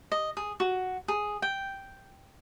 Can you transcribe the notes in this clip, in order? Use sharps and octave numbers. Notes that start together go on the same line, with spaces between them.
D#5
G#4
F#4
G#4
G5